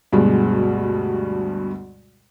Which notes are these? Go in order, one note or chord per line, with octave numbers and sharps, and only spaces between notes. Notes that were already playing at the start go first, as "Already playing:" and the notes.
D2 G2 B2 G#3